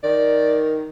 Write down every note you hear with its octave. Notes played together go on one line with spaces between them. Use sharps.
D#3 D5